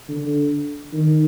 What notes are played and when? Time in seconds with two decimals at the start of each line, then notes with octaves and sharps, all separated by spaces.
0.08 D3
0.92 D#3